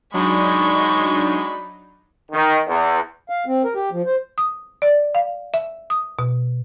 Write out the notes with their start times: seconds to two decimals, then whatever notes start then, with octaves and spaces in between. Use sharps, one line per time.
0.14 F#3 G#3 D4 D#4 B5 C#6
2.31 D#3
2.68 E2
3.29 F5
3.47 C4
3.64 A#4
3.75 G4
3.92 F3
4.06 C5
4.38 D#6
4.82 D5
5.15 F5
5.54 E5
5.90 D#6
6.19 B2